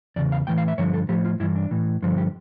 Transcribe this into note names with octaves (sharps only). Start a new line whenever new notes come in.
E2 C#3 D5
F5
A2 E3 G5
F5
E5
G2 D3 F3 C#5
A4
A2 F3 G4
F4
G2 E3 E4
D4
A2 E3
G2 D3 F3
G4